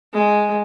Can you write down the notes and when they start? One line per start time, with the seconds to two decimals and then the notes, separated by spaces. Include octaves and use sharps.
0.13 G#3